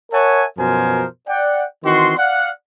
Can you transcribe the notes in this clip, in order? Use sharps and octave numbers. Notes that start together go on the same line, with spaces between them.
A#4 C#5 E5 F#5 G#5 A5
F#2 B2 F3 A#4 C5 G#5
D5 F#5 G5
D#3 E3 C4 F#4 C6
D5 F5 F#5